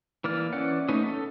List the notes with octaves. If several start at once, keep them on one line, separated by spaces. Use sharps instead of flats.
E3 A#3 D5 F6
E3 C#4 D5 F#5
A3 B3 C#4 D#4 D#5
A4